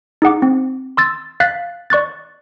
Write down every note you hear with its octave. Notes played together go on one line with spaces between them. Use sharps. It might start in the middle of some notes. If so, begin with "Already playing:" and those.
D#4 G#4 F#5 D6
C4
C6 E6 A6
F5 F#6 A6 B6
D5 C#6 F#6 A6